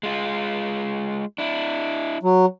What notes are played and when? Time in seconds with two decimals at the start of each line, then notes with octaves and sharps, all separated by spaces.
0.03 G#3 F4
1.38 D4 E4
2.23 F#3